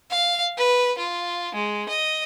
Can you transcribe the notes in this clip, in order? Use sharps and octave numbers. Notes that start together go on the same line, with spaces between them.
F5
B4
F4
G#3
D#5